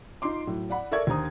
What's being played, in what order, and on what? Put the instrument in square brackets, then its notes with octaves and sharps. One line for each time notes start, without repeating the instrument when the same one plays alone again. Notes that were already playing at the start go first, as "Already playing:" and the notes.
[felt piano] D#4 F4 C6 D6
A2 F#3
D5 F#5 B5
A4 A#4 D5 E5 C#6 G#6
D#2 D3 C5 A#5 D#6